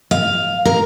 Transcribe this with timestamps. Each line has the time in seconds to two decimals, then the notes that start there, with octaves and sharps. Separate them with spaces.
0.11 F5
0.65 A#4